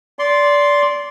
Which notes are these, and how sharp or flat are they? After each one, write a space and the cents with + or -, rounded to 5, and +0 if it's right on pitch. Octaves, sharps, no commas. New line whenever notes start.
D5 -20 C6 +0